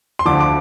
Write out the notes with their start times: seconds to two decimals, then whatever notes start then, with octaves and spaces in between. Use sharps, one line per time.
0.19 C6
0.25 D2 D3 F3 D6
0.40 D6